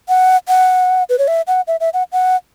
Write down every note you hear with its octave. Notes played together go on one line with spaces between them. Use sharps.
F#5
F#5
B4
C#5
E5
F#5
E5
E5
F#5
F#5